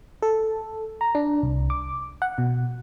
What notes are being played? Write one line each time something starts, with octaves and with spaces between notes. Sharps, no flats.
A4
A#5
D4
C2
D6
F#5
B2